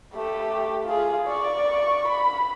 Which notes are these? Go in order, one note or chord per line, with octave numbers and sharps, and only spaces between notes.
A3 G4
F4 G#4
D5 C#6
B5